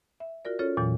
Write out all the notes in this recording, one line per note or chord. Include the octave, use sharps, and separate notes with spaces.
E5
F4 F#4 A#4 D5
C#4 F4 A4 C#5
E2 A#2 E3 F#3